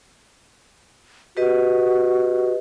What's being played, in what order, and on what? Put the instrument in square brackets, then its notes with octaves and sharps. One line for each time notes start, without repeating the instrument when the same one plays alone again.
[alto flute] F#4 [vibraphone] G4 B4 D#5